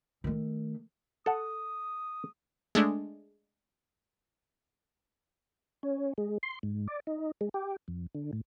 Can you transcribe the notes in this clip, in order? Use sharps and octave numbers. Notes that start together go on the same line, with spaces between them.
D#3 A3
A4 F#5 D#6
G#3 A3 D4
C#4
G#3
C6
G#2
D5
D#4
G#3
G4
F2
D3
A2